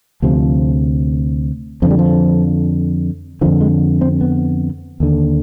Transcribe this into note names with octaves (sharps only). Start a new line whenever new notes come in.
D2 C3 F3
F2 D3 F3
G3
F3
F2 D3 F3
G#3
C4
B3
D#2 D3